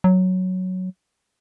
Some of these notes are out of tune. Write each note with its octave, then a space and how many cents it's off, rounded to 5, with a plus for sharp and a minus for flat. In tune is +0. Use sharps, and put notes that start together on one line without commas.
F#3 +0